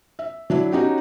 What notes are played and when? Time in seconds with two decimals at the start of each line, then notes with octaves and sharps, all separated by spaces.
0.19 E5
0.50 F#3 D4 E4
0.72 C#4 D#4 F#4 G4